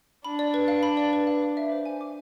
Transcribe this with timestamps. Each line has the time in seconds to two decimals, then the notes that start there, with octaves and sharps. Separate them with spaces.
0.25 D4 B5
0.39 D5
0.54 B4
0.68 F5
0.83 B5
0.97 D5
1.13 B4
1.27 F5
1.42 D6
1.57 E5
1.72 C5
1.86 G#5
2.01 D6